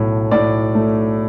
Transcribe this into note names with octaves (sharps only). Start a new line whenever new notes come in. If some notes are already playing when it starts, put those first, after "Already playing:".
Already playing: B1 A2
A2 D5
A3